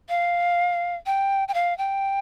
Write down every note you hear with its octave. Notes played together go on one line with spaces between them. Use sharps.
F5
G5
G5
F5
G5